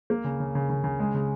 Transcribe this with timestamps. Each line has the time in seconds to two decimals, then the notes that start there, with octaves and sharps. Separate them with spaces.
0.10 A#3
0.24 C#3
0.40 C#3
0.55 C#3
0.70 C#3
0.84 C#3
0.99 G#3
1.14 C#3